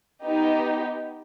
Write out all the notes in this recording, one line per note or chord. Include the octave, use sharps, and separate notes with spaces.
B3 D#4 G4